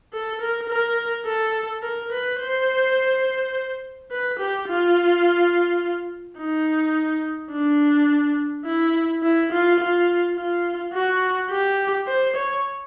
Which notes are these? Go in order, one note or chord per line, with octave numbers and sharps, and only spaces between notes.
A4
A#4
A#4
A4
A#4
B4
C5
B4
G4
F4
D#4
D4
E4
E4
F4
F4
F4
F#4
G4
C5
C#5